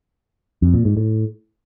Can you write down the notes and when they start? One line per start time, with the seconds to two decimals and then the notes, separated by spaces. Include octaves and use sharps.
0.62 F2
0.74 A#2
0.85 G#2
0.97 A2